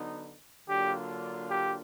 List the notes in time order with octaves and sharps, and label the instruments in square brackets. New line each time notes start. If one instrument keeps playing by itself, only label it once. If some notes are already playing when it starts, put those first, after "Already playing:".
Already playing: [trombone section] D3 F#3 B3 D#4
[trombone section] D3 F#3 A#3 D4 F4 [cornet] G4
[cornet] G4